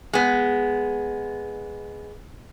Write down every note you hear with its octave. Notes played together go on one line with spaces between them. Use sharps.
G#3 B3